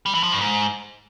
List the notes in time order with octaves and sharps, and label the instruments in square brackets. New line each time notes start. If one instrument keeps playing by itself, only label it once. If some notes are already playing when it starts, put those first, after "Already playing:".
[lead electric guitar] G3
E3
F3
G2
G#2